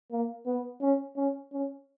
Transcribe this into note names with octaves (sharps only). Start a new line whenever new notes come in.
A#3
B3
C#4
C#4
C#4